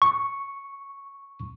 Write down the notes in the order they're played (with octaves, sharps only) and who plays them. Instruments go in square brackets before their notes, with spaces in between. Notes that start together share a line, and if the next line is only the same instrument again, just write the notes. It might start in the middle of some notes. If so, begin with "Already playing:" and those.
[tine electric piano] C#6